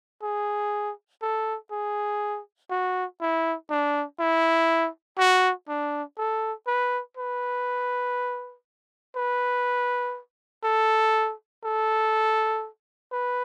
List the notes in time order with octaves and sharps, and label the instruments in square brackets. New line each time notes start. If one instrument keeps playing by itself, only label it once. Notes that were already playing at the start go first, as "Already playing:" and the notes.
[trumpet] G#4
A4
G#4
F#4
E4
D4
E4
F#4
D4
A4
B4
B4
B4
A4
A4
B4